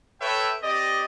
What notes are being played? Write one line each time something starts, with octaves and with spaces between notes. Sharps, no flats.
A4 B4 C#5 E5 G5
C4 G4 D5 D#5